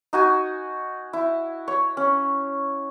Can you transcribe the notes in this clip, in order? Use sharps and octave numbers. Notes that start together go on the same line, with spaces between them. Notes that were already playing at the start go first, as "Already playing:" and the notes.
D#4 F#4 G#5
E4
C#5
C#4